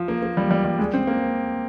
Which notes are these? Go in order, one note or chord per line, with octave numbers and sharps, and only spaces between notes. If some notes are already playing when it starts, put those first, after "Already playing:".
Already playing: F3
A#3
A#3
G3
G3
G3
G#3
C4
A#3